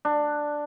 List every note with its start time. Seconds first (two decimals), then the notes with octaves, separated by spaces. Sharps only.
0.05 D4